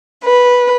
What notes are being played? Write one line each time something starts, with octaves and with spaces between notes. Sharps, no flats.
B4